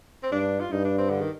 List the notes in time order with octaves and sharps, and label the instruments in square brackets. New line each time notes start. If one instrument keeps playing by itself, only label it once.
[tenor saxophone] C4
[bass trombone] G2 [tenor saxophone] D4
[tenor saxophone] F4
[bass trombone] G2 [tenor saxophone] D#4
[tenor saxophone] D4
C4
D3
D#3